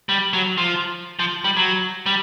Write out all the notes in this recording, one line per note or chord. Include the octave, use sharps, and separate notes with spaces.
G3
F#3
F3
F3
G3
F#3
G3